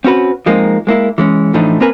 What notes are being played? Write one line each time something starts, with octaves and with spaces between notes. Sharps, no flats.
C4 C#4 F#4 B4
F3 G#3 A#3 C4 D#4
G#3 A#3 E4
E3 G#3 C#4
A2 E3 F3 A3 D4 D#4
A#3 C4 A#4 B4 G#5